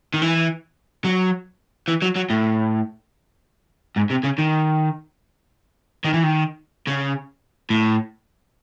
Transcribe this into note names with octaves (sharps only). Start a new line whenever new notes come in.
D#3
E3
F#3
E3
F#3
F#3
A2
G#2
C3
C#3
D#3
D#3
E3
D#3
C#3
A2